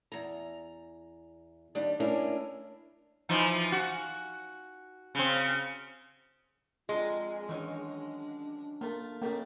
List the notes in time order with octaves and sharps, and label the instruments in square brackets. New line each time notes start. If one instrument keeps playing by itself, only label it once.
[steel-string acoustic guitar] E2 A#5
D#2 G3 D4
A3 A#3 C#4 D4 E4 A#4
[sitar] E3 F3 D#4
F#4
C#3 C4
[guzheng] F2 D4 A#4 [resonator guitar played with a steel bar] G#3 [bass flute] F4
[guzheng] D#3 F#3 C#4 [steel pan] E3 [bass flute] D4
[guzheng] A3 F4 [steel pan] A#3
[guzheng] B2 A3 G4 [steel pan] A#3 C#4